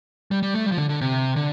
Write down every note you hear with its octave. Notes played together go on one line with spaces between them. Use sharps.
G3
G3
A3
G3
F3
D3
D3
C3
D3